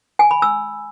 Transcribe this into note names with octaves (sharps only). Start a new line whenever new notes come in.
G#5
B5
E6